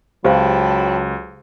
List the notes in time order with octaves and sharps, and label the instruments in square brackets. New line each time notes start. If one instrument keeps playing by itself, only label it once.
[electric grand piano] C#2 [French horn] F#3 [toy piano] G4 C5 F5 [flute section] G5 A5 B5